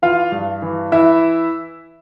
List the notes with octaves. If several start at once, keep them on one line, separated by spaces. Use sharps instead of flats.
E3 F4 F5
G2
E3
E3 E4 E5